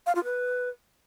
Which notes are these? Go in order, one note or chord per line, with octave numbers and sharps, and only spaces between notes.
F5
F4
B4